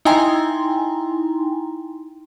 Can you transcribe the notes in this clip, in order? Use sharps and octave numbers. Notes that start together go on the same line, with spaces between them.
D#4 E4 G5 G#5 A#5 C6